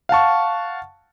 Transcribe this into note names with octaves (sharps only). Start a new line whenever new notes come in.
F5 F#5 A5 C#6